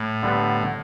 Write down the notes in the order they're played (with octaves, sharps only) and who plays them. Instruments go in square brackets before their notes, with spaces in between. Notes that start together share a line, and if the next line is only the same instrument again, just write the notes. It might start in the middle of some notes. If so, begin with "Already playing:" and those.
Already playing: [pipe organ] A2
[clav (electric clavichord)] D3 G3 B3